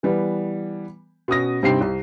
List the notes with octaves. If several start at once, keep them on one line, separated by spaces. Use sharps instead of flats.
E3 G3 B3
B2 C#4 D#6 A#6
G2 C3 C4 D#4 G5 C7
C2